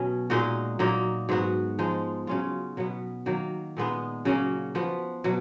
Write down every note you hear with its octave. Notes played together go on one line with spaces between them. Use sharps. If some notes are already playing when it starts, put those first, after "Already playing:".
Already playing: B2 F#3 C#4
A#2 G#3 D#4 F#4
A#2 F#3 A#3 D#4
G#2 F#3 B3 F#4
F3 G#3 D#4
C#3 F#3 C#4 F4
B2 F#3 B3
D#3 F#3 A#3
A#2 G#3 B3 D#4
C#3 F#3 A#3 C#4
F3 B3 F#4
B2 F#3